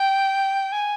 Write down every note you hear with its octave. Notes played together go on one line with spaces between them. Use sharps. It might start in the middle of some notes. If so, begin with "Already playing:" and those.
Already playing: G5
G#5